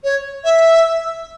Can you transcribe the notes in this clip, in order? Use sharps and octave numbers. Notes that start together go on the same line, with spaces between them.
C#5
E5